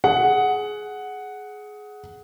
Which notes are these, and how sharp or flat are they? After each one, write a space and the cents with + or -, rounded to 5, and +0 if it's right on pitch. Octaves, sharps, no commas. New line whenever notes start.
G#4 +15 F#5 +0